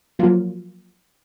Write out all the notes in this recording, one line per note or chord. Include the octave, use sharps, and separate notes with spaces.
F3 F#3 A#3 F4